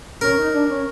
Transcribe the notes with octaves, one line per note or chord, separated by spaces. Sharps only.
C#4 A#4
D#4
D4
C#4